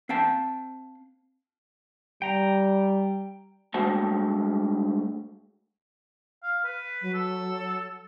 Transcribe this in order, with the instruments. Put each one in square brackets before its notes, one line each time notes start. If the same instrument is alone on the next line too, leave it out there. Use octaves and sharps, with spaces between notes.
[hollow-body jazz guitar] C4 F5 G5 A5
[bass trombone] G3 [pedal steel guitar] G5 A#5
[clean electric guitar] G2 G#3 A3 F#4 C5 A5
[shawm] F5
B4
[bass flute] F#3
[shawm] A4